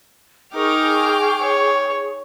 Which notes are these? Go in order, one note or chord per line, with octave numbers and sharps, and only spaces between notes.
D#4 G#4 A#4 G5 C#6 D6 F6
C#5